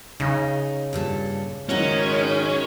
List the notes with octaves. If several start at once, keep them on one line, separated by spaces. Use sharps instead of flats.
C#3 D#4
G2 A#2 A4
G#2 D#3 F#3 G#3 C#4 D#4 E4